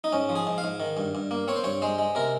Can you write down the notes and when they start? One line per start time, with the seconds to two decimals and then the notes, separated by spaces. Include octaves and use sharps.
0.04 D#4
0.12 G#2 C#4
0.29 F3
0.35 G#4
0.47 G#2
0.58 F5
0.64 G#2
0.80 D#3
0.97 G2
1.15 G2
1.31 A#3
1.48 C4 C#5
1.56 C5
1.64 G2 C#5
1.82 G#3 C5
1.98 G#3
2.15 C3 A#4